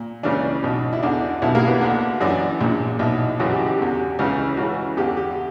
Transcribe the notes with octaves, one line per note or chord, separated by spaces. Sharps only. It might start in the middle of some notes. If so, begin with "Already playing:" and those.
Already playing: A#2
C#2 C#3 E3 D4
B1 B2
E4
E2 D3 D4
B1 B2 E4
A#3
B3
D2 D3
F#2 E3 D4
A#1 A#2
B1 B2 E4
F#2 C#3 E3 F#4
G4
G4
E2 D3
C#2 C#3 E3
C#2 C#3 E3 F#4
E2 D3 G4
G4